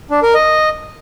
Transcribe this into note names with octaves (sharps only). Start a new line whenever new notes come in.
D4
A#4
D#5